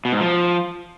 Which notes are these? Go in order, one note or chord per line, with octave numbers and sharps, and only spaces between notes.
B2
G#2
F3